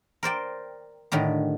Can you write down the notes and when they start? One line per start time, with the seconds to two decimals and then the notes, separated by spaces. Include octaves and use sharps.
0.23 A#4 C5 D5 G5
1.12 A2 D3 D#3 G4